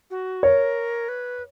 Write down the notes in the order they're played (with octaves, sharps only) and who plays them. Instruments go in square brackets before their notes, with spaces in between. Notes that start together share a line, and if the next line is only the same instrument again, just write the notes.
[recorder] F#4
[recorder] A#4 [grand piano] C#5
[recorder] B4